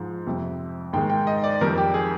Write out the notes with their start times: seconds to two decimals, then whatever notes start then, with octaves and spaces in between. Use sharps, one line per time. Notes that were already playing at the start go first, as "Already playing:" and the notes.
Already playing: G#2 F3 G#3
0.27 F2 C3 G3
0.93 G#2 D#3 G#3 G5
1.10 G5
1.27 D#5
1.44 D5
1.61 F2 D#3 G3 A#4
1.77 G4
1.94 G#4